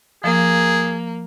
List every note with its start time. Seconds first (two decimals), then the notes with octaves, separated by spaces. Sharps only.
0.24 F3 A#3 G#4